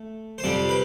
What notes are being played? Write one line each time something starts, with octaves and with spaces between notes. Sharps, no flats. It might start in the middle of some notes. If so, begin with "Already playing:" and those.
Already playing: A3
C5
F2 C3 G3 C4 D5
B4